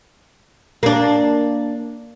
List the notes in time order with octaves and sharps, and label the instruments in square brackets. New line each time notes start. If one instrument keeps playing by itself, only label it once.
[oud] A#3 D4